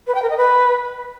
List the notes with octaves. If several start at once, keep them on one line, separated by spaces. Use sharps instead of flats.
B4
G5
A#4
D#5
B4